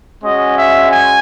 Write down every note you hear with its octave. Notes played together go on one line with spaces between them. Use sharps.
G#3 C#4 F#4 D#5
E5
G#5